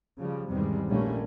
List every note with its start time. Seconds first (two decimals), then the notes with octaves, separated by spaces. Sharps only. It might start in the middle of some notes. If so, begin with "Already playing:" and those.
0.18 C#3 F3 G3
0.49 E2 G#2 C3 D#3 G3 G#3
0.89 A#1 G3 A3 A#3 C#4